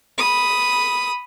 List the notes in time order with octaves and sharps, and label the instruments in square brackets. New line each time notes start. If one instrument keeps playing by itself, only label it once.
[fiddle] B5 D#6